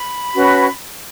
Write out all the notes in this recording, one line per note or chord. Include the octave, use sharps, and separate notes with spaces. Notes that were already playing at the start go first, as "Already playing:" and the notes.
Already playing: B5
C#4 F#4 B4